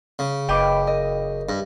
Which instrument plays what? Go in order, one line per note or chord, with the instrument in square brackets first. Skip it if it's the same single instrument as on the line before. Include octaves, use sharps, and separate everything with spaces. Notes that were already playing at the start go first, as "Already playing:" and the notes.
[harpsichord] C#3
[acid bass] F#1 [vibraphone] B4 D#5 B5 [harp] G5 D6
[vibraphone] A#4 [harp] D#5
[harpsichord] G2